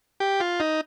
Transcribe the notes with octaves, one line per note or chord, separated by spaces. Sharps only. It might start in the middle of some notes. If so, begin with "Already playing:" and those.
G4
F4
D#4